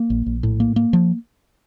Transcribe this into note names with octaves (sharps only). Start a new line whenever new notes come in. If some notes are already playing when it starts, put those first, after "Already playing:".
Already playing: A#3
A#1
A#1
A2
A#3
A#3
F3